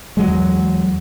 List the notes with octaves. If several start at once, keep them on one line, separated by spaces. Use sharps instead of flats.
E2 F#3 G#3